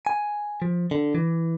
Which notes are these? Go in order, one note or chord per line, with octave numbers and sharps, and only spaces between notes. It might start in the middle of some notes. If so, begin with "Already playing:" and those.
G#5
F3
D3
E3